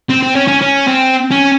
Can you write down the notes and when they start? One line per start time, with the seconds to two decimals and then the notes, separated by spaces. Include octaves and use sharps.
0.09 C4
0.23 C4
0.35 C#4
0.48 C#4
0.62 C#4
0.87 C4
1.31 C#4